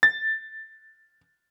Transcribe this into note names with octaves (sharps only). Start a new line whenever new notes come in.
A6